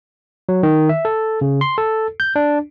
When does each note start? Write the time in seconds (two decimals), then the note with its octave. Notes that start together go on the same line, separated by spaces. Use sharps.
0.49 F#3
0.63 D#3
0.89 E5
1.05 A4
1.41 C#3
1.61 C6
1.78 A4
2.20 G6
2.36 D4